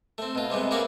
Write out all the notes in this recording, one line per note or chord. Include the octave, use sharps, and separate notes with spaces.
A3 C4
B2 F4
C3 G3 G#3 B3
A#3 C#4 F#4 D5 E5 F5